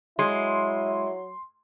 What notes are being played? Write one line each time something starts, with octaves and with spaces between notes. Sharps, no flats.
F#3 G#3 E4 C6